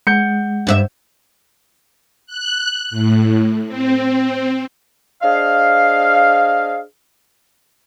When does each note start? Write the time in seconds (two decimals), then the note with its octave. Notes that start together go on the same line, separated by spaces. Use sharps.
0.07 G#3 F#5 G6 C#7
0.67 G2 B4 E5
2.27 F#6
2.90 A2
3.67 C4
5.23 D4 G#4 C5 D#5 F5